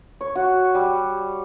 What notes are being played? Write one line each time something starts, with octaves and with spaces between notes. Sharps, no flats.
C#5
F#4
G3